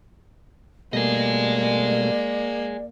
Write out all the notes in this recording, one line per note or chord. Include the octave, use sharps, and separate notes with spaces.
B2 G3 A3 A#3 G#4 D5 D#5